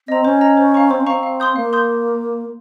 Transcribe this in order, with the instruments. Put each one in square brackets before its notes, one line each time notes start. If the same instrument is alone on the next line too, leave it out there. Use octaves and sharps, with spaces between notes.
[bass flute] C4 [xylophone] D#5 A#5
[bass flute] C#4 [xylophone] C5
[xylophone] D#5 A#5
C5
F5 A#5 C#6
[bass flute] C4 [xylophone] C5
[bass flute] C#4
[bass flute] C4 [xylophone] F5 A#5 C#6
[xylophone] F5
C6 D#6 G6
[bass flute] A#3 [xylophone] F5
[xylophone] C6 D#6 G6